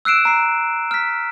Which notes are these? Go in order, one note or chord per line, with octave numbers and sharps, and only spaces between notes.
E6 F#6 C7 D7 E7
A#5 C7
F6 B6